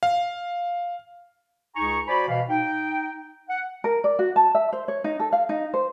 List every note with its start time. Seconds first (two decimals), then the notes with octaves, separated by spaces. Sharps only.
0.03 F5
1.76 C#2 D#4 G#4 G#5 A#5 C#6
2.08 F#4 C5 D5 G#5 B5
2.29 B2 E3 F5
2.49 D#4 G5
3.48 F#5
3.84 A#4
4.04 D5
4.19 F#4
4.36 A5
4.55 E5
4.73 C5
4.88 C#5
5.04 D#4
5.19 A4
5.33 F5
5.49 D#4
5.74 C5